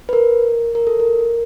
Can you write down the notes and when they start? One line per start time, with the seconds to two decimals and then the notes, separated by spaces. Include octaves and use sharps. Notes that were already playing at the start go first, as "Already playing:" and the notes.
0.09 B4
0.13 A#4
0.75 A#4
0.87 A4
1.00 A#4